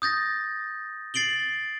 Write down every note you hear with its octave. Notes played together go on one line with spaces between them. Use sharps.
D#6 G6 A6 A#6
A6 C7 D7 F#7 G7